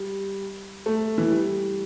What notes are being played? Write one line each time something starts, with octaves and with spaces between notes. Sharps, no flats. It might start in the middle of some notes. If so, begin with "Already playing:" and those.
Already playing: G3
A3
E3
G3